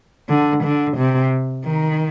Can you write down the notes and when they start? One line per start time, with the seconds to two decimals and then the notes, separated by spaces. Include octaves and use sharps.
0.29 D3
0.63 D3
0.97 C3
1.64 D#3